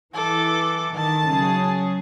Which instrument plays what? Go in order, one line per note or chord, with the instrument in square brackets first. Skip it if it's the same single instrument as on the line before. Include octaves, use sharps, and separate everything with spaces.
[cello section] E3 [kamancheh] A4 D6
[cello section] D#3 [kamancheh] A5
[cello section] C#3 F#3 G#4